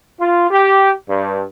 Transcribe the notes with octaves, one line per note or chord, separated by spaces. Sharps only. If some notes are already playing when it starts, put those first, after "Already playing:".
F4
G4
G2